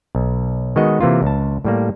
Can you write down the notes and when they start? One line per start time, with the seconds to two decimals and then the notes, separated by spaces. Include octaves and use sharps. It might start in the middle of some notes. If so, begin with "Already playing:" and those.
0.15 B1
0.76 D#3 G#3 B3 F#4 D#5
1.01 C3 E3 A#3 F4
1.23 C#2 A5
1.65 A2 G3 A#3